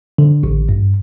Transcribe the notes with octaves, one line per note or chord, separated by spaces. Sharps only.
D3
A1
G2